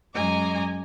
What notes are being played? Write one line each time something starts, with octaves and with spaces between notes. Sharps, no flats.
F#2 G#3 D#5 G#5 A#5 D6